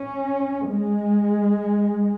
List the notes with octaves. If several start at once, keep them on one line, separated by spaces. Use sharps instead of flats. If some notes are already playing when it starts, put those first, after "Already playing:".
Already playing: C#4
G#3